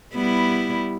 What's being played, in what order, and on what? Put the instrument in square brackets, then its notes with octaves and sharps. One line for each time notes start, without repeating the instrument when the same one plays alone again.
[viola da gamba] G3 B3 E4